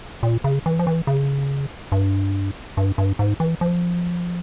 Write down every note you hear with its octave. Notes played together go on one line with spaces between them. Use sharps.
A#2
C#3
E3
F3
E3
C#3
G2
G2
G2
G#2
E3
F3